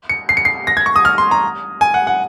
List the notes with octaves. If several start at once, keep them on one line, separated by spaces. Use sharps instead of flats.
C#7
C7
C#7
C7
A#6
G#6
C#6
D#6
F6
C6
A#5
G#5
F#5
F#5